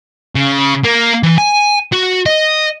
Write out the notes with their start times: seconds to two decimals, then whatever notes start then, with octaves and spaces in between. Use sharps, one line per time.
0.35 C#3
0.84 A#3
1.23 E3
1.38 G#5
1.92 F#4
2.26 D#5